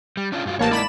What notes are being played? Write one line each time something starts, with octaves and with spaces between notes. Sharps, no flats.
G3
C#4 D4 F4
G2 F4 F#4
A1 A#3 G4 C5 C#5 A5
G#3 D#4 E4 D5 B5 E7